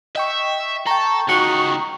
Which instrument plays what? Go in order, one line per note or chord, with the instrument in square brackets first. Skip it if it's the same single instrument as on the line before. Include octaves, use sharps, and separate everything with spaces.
[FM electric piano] D#5 G5 C#6 [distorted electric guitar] E5
[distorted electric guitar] A4 [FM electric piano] G5 A#5 [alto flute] C#6
[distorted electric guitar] C#2 D#4 [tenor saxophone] F#4